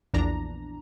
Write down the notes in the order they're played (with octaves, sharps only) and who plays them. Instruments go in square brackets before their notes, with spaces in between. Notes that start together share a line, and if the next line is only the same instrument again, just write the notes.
[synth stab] A#1 E2 D4 A#5